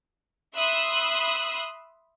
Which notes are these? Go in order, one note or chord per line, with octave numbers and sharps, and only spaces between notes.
E5 B5 C6 D#6 E6 F#6